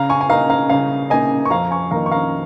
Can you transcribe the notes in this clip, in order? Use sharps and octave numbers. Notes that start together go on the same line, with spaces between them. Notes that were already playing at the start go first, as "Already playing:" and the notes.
Already playing: C#3 F5 A#5
G#5 C#6
G#5
A#3 D#4 F5 A#5
F5 A#5
C#3 F5 A#5
A#3 D#4 D#5 G#5
C#6
F2 F5 A#5
G#5 C#6
D#3 A#3 D#4 F5 A#5
C#6
F5 A#5